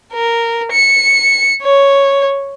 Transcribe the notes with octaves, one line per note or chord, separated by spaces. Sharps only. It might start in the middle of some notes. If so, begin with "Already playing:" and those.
A#4
C#7
C#5